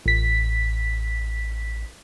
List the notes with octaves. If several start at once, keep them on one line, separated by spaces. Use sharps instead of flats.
A1 B6